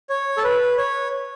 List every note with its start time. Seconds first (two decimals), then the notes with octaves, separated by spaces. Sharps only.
0.09 C#5
0.37 A4
0.44 B4
0.78 C#5